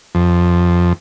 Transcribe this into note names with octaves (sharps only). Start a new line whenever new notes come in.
F2